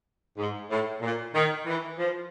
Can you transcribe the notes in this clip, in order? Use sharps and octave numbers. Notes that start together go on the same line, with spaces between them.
G#2
A2
A#2
D#3
E3
F3